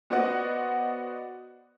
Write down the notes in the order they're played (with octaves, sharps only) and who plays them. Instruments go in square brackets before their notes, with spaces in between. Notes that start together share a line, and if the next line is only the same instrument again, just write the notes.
[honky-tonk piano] B3 F#4 C5 D5 D#5 F#5